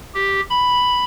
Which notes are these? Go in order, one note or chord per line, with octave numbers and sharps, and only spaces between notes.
G4
B5